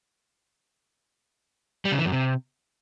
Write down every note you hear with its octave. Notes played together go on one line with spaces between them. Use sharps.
G3
C#3
E3
F#2
C3